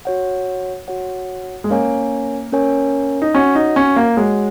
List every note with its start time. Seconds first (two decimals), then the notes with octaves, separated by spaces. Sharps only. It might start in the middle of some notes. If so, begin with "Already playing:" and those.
0.05 F#4 C#5 F#5
0.88 F#4 C#5 F#5
1.64 G#3
1.70 A#3 C#4 A#4 C#5 G#5
2.52 C#4 A#4 C#5 G#5
3.22 D#4
3.35 C#4 F#4 C#5 F#5
3.55 D#4
3.76 C#4
3.96 A#3
4.17 G#3 F#4 C#5 F#5